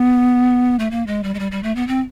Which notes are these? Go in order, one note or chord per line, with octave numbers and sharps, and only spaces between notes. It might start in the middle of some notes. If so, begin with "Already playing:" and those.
Already playing: B3
A3
A#3
G#3
G3
G#3
G3
G3
A3
B3
C4